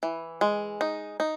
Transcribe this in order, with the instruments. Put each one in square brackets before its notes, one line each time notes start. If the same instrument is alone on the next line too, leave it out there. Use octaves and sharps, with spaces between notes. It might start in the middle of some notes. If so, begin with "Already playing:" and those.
[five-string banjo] E3
G#3
D#4
D#4